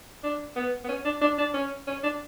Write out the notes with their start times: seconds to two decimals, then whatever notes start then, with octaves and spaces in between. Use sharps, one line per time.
0.23 D4
0.56 B3
0.84 B3
0.89 C#4
1.05 D4
1.22 D4
1.38 D4
1.54 C#4
1.87 C#4
2.03 D4